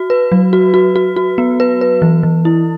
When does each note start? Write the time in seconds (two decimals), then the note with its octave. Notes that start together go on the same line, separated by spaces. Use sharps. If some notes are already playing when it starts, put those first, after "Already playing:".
Already playing: F#4
0.10 B4
0.32 F#3
0.53 F#4
0.74 F#4
0.96 F#4
1.16 F#4
1.38 B3
1.60 B4
1.81 B4
2.02 E3
2.23 E3
2.45 E4